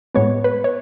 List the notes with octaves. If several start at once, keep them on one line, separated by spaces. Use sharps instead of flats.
A2 G#3 B3 C#5
B4
C#5